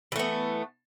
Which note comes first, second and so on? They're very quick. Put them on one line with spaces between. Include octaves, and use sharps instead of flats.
E3 A3 B3